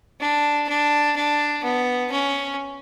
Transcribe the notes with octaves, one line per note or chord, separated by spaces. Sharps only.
D4
D4
D4
B3
C#4